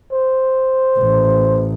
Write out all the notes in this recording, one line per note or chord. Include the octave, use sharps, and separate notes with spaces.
C5
A1